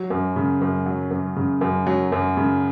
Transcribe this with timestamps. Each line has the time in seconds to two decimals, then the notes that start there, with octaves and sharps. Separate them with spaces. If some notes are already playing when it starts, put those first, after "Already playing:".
Already playing: F#3
0.10 F#2
0.36 C#3
0.61 F#2
0.86 F#3
1.11 F#2
1.36 C#3
1.61 F#2
1.87 F#3
2.12 F#2
2.37 C#3